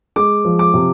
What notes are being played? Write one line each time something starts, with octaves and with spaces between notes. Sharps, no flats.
G#3 D6
F3
D6
C3